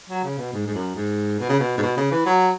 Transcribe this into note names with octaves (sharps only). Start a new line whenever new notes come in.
F#3
C#3
B2
G#2
G#2
F#2
G#2
B2
C#3
B2
G#2
B2
C#3
E3
F#3